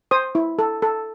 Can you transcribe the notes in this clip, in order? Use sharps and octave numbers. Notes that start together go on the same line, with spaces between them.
C5 D#6
E4
A4
A4